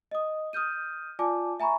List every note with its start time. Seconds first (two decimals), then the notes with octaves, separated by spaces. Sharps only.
0.11 D#5 D#6
0.53 D#6 F6 G6 D#7
1.19 F4 D5 G#5 A5 D6
1.60 E5 G#5 A#5 B5 C#6